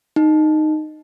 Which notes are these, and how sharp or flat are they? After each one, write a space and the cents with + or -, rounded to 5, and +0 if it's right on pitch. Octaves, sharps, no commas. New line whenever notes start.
D#4 -10